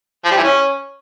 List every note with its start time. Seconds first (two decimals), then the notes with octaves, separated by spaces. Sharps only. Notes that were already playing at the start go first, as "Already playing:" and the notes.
0.25 F3
0.31 G3
0.37 E3
0.43 C#4